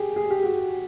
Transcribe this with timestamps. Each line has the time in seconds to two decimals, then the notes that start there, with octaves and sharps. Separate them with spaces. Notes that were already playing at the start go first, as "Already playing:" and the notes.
Already playing: G4 G#4
0.16 G#4
0.30 G4
0.44 F#4